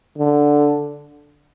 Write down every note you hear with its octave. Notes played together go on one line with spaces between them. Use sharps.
D3